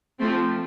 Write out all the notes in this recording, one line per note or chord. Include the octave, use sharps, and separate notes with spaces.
F3 A3 C4